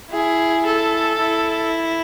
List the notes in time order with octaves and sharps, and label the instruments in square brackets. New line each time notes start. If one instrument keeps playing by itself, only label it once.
[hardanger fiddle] E4 [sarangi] G#4
[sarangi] A4
[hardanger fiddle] E4